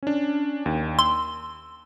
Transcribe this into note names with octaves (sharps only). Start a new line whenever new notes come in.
C#4 D4
D#2
C6 E6